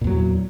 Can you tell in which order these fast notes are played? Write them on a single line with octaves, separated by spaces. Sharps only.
A#2 E2 F#3